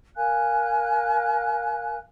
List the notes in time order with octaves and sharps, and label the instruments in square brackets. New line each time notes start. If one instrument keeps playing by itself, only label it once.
[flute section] A#4 F5 G#5 F#6